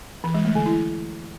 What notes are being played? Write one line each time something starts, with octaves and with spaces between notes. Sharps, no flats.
E3
G#3
A3
D3
E4